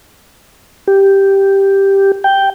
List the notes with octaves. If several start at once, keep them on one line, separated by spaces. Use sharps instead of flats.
G4
G5